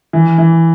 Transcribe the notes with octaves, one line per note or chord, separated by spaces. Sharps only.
E3
E3